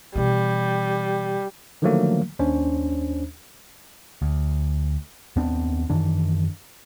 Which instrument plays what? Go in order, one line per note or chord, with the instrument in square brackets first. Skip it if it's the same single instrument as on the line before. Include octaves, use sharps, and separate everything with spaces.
[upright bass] B2 E3 [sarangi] G3
[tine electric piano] D3 D#3 F3 F#3 A3 A#3
D#2 C#4 D4 C5
[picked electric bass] D2
D#2 B3 C4 D4
F#2 D#3 E3 D4